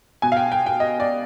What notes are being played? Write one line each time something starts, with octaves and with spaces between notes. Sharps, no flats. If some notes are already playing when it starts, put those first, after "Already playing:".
B2 G#5
F5
G5
G5
G5
D#5
D5